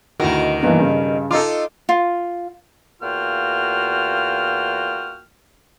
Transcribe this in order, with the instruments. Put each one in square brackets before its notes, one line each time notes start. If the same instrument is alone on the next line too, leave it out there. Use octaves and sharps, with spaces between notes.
[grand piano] D2 E4 F#4 [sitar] B2 D#3 A#4
[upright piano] G2 A#3 B3 [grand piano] E3 D4
[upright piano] G2 [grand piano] C#3
[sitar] D#4 F4 [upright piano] A4 D6
[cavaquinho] F4
[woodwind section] E2 A#3 F4 F#4 G5 F6